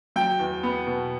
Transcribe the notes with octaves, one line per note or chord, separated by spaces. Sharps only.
F#3 G5
E2
B3
B2